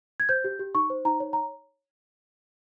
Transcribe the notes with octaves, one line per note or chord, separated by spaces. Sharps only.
G#6
C5 G6
G4
G4
D#4 C#6
C5
D#4 A#5
C#5
A#5